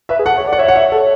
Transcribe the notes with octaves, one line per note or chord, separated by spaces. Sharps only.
B4 E5
G#4
A4 F#5
C#5
D5
F#5
C#5 E5
F#5
E5
A4